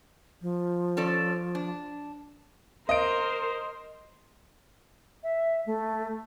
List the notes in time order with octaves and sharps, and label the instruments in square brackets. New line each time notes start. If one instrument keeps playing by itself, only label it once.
[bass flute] F3
[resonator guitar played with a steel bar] C#4 A4 D5
D4
[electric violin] A#4 C5 [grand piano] D#5 D7
[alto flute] E5
A3